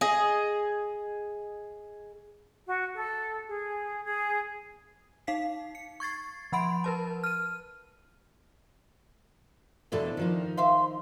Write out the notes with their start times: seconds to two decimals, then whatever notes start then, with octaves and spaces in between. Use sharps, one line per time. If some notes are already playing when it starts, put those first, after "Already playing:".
0.01 G#4 D#5
2.67 F#4
2.95 A4
3.48 G#4
4.04 G#4
5.27 D#4 F5 B6 C7
5.75 C#7
6.00 C#6 G#6 A6 C7
6.52 F3 F#5 B5 C6 D7
6.84 A#4 B4 A5
7.24 F6 D#7
9.92 E2 B2 C4 D4 E4 A4
10.17 D#3 F3 D#4
10.57 C5 E5 F5 C6